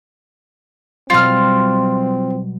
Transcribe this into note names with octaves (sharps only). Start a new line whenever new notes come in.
B2 F#3 G3 C4 F4 F6